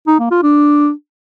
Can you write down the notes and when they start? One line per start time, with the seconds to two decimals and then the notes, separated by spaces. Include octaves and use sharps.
0.07 D#4
0.19 A#3
0.31 F4
0.43 D4